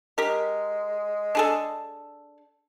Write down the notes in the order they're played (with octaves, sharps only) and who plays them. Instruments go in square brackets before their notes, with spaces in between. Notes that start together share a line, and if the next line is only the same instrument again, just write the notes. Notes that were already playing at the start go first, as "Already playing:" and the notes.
[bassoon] G#3 [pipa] G4 A#4
[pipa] D4 G#4 A4